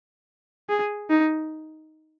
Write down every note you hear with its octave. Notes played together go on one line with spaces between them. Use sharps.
G#4
D#4